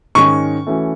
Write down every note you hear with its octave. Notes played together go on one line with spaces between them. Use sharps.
G#2 D#3 G#3 C#4 C#6
E3 A3 C#4 F#4